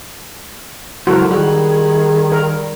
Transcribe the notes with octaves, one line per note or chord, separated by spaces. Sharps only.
C#2 F#3 E4 F#4 A4 A#4 C5
D#3 G3 F#4 G#4
A#4